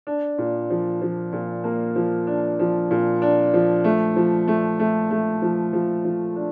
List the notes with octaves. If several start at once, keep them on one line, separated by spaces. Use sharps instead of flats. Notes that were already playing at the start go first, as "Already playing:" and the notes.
D4
A#2
F3
F3
A#2
A#3
F3
D4
F3
A#2
D4
F3
A3
F3
A3
A3
A3
F3
F3
F3
D4